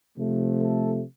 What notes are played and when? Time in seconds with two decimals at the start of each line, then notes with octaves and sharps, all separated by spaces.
0.18 C3 F3 A3
0.62 A4